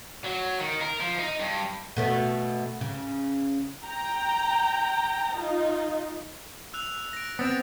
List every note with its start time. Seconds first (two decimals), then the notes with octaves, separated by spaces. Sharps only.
0.24 F#3
0.59 D#3
0.82 A#4
1.01 F3
1.19 D#4
1.40 G2
1.97 B2 A3 B3
2.81 C#3
3.86 G5 A#5
5.34 D#4 F4
6.74 E6 F#6 F7
7.13 A#6 D7
7.39 B3 C4 D#6 A6 D7